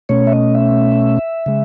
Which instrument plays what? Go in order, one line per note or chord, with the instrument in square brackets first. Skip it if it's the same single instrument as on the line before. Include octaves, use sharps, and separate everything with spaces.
[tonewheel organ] B2 A3 C#4 C#5
E5
D#5
E5
C#3 G#3